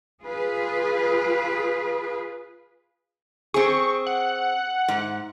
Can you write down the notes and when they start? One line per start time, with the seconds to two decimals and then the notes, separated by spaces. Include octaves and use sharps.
0.23 F4 G#4 B4
3.54 C4 G#4 C#6
4.07 F#5
4.88 G#2